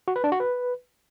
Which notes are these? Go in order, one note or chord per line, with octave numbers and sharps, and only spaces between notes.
F#4
B4
D4
F#4
B4